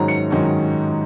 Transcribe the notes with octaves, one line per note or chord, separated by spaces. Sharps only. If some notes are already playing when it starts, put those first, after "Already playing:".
Already playing: G#2 D#3 F#3 C#4 A#5
C#7
G#2 D#3 F#3 C#4